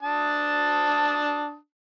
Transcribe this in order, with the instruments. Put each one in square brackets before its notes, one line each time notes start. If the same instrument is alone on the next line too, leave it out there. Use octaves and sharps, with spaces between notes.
[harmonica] D4 A5 D#6